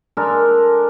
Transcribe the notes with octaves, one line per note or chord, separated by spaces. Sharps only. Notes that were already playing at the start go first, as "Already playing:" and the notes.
G#3 D4 A4 A#4